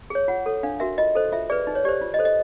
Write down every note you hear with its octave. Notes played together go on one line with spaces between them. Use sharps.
G#4 C#5
F4 F#5
A4 C#5
D4 F5
F#4 A#4 E5
F4 D#5
A4 C5
F4 E5
G#4 B4 D5
D#4
C#5
G4 C5 D5
F4
D#5
A4 C5
D#5